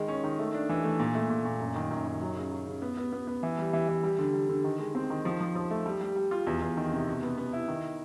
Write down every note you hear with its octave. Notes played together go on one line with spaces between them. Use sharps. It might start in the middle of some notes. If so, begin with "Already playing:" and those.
Already playing: D#3 G#3
C#4
D#3
A3
D4
E3
A3
A#2
A3
A#2
A#2
F#2
D#3
F#2
D#3
F#3
C#3
F#3
C#3
B3
B3
B3
B3
E3
G3
E3
E3
G3
D3
G3
D3
D#3
G#3
C4
D#3
F3
F3
F3
A3
G3
G3
G3
F4
E2
E2
D#3
C3
B2
B3
B3
E4
D#3